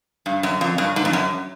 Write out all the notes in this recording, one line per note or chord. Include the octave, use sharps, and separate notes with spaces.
G2
F#2
F2
G2
G#2
F2
F#2